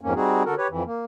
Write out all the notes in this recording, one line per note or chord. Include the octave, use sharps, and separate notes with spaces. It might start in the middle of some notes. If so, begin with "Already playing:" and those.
F2 G#2 A#3 C#4
G3 C4 D#4 F#4 G#4
D3 F#4 A4 A#4
G4 B4 C#5
F2 E3
A#3